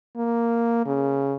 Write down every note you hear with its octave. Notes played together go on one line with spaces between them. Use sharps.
A#3
C#3